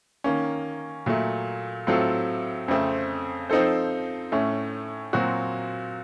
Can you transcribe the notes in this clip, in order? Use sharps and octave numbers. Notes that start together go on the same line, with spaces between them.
D#3 A#3 C#4
A#2 F#3 A3
A2 F#3 C4 F4 A4
F2 C#3 A3 C4
F3 C4 D#4 A4 C5
A2 A3 C#4
A#2 F#3 C4 F#4